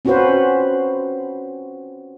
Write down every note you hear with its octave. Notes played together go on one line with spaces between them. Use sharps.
C4 C#4 F4 F#4 B4 C5